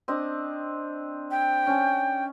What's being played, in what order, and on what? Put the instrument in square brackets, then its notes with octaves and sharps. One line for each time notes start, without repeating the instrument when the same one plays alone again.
[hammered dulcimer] C4 D4 D#5
[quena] G5
[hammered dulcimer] C#4 A5